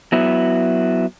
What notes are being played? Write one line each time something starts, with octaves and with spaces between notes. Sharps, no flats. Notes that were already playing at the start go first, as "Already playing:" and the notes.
F#3 B3 E4